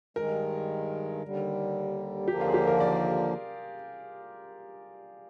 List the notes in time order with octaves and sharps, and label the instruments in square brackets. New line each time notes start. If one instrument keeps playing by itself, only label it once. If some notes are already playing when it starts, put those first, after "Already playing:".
[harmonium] G2 D#3 G#3 [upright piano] A#4
[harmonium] D#2 D3 G3
[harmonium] D#2 D3 F3 A#3 [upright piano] G4
[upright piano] F4
G#4
G4
A#4
D5